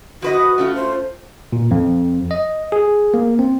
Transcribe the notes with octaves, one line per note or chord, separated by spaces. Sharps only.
F3 F#4 B4 D#5
A3 C#4 F4
C5
A#2
F2
D#5
G#4
A#3
C4